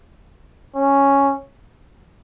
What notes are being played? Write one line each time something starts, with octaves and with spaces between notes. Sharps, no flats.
C#4